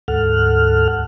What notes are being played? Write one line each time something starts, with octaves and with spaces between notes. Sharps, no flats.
D2 G#2 A4 F#5 F6